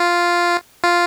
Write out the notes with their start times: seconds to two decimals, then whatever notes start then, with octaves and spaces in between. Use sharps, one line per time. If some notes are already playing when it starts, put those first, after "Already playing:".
Already playing: F4
0.84 F4